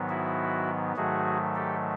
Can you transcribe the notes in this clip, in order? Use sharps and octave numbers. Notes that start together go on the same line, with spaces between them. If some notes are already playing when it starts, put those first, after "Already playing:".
Already playing: G#2 D#3 F#3 B3
E4 F#4
G#2 D#3 F#3 A3 F#4 G#4
G4 A4